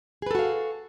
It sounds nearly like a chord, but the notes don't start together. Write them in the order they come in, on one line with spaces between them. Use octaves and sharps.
G#4 B4 A4 F#4 F5